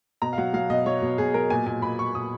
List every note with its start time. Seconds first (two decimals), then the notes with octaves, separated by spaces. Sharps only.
0.22 B2 A#5
0.33 F5
0.38 F#3 F#5
0.54 F#3 F5
0.70 B2 D#5
0.86 F#3 C#5
1.02 B2
1.18 B2 G#4
1.34 F#3 A#4
1.50 A#2 G#5
1.66 A#2 G#5
1.82 A#2 B5
1.99 A#2 C#6
2.15 A#2 D#6